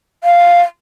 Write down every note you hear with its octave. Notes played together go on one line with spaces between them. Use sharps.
F5